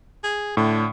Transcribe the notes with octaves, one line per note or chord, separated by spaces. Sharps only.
G#4
A2 D3